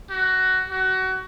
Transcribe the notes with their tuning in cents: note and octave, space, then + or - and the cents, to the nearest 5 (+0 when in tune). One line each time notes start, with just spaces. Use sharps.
F#4 +15
F#4 +25